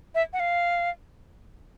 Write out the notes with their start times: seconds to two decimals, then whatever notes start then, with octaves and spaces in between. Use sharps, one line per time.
0.15 E5
0.33 F#5
0.40 F5